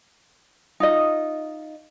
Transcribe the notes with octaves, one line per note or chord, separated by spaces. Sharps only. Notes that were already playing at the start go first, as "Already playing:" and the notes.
D#4 F4 D#5